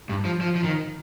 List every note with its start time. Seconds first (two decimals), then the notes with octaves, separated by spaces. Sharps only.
0.09 G2
0.25 F3
0.41 F3
0.55 F3
0.64 D#3